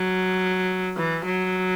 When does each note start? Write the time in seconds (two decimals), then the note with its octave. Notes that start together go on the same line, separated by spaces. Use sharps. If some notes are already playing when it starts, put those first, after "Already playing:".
Already playing: F#3
0.97 E3
1.26 F#3